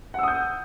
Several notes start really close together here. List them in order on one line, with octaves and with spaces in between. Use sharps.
F#5 E6 D#6 G6